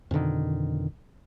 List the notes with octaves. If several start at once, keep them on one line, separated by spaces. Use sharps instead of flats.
F2 B2 D3 D#3